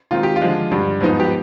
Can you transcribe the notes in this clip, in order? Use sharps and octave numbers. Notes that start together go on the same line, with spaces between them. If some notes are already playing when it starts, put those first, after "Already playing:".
D#3 G#3 C4 D#4 F4
G4
F4
D3 F3 G#3
G2 D3 G3
G#2 F3 B3 D#4
G4